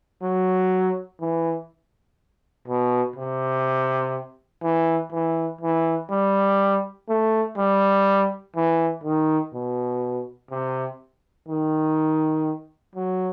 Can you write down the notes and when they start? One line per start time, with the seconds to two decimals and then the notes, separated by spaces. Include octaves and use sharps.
0.22 F#3
1.21 E3
2.68 B2
3.16 C3
4.63 E3
5.12 E3
5.61 E3
6.10 G3
7.09 A3
7.57 G3
8.56 E3
9.04 D#3
9.54 B2
10.51 C3
11.48 D#3
12.95 F#3